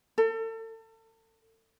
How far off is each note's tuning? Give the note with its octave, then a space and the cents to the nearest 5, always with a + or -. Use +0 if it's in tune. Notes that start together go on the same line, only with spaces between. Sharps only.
A4 +35